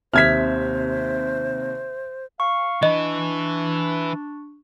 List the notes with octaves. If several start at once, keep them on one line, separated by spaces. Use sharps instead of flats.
D#2 C3 C5 E5 F6 G#6 B6
F5 C#6 C#7
E3 D4 E4 D#5